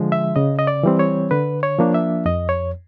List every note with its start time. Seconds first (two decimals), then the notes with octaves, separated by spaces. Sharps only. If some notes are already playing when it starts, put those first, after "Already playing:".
Already playing: D3 F3 G#3
0.12 E5
0.36 C#3 D#5
0.59 D#5
0.67 D5
0.83 E3 G3 C4
0.99 C#5
1.31 D3 B4
1.63 C#5
1.78 F3 A#3 D4
1.94 E5
2.26 F2 D#5
2.49 C#5